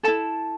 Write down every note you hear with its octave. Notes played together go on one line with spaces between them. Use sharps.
E4 A4 A5